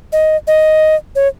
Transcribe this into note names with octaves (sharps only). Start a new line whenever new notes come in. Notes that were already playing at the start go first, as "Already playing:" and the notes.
D#5
D#5
C#5